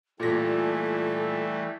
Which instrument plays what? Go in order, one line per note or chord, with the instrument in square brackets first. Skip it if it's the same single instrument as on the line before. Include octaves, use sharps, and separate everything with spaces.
[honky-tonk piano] A#2 A#6 [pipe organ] E3 G3 A3 [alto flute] A4